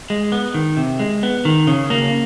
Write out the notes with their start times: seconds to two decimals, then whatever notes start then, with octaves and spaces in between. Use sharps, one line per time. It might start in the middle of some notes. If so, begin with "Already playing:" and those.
0.10 G#3
0.32 B3
0.54 D#3
0.77 C3
1.00 G#3
1.23 B3
1.45 D#3
1.67 C#3
1.90 A#3